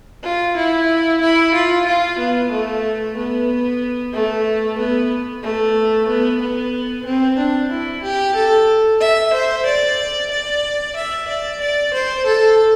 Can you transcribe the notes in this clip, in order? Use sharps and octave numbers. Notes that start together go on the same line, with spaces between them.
F4
E4
E4
F4
F4
B3
A3
B3
A3
B3
A3
B3
B3
C4
D4
E4
G4
A4
E5
C5
D5
D5
E5
D5
D5
C5
A4